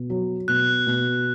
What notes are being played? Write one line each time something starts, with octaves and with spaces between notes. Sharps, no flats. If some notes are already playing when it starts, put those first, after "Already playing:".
Already playing: B2
F#3
B2 F#6
B2